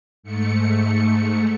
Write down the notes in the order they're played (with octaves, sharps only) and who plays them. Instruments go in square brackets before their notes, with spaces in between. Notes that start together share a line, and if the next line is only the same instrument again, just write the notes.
[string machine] G#2 A3 C#7